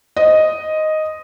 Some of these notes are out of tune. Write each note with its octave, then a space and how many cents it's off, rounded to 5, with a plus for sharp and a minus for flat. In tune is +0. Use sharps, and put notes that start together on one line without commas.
C5 +0 D#5 +0